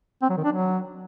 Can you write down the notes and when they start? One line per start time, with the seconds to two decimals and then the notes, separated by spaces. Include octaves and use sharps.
0.22 C4
0.30 F#3
0.37 D#3
0.45 D4
0.52 F#3